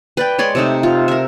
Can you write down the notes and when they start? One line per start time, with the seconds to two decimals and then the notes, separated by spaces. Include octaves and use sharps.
0.17 B4 D5 G5
0.39 G#3 C#5 D5 C6
0.55 C3 A3 D#4
0.83 F4
1.08 A#4 E5